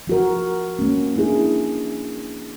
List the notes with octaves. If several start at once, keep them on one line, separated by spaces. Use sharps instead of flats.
F3 F#4 A#4
A#3 C#4
A#3 D4 E4 G#4